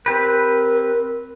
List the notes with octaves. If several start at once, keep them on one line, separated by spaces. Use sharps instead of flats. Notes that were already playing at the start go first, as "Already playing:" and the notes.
C4 G4 A#4 B4